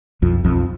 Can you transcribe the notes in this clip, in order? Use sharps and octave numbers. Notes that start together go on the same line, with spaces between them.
B1 F2 F3
B1 F2 F3